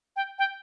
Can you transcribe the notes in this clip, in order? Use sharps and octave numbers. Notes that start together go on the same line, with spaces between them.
G5
G5